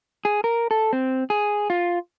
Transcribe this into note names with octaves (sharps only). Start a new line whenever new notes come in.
G#4
A#4
A4
C4
G#4
F4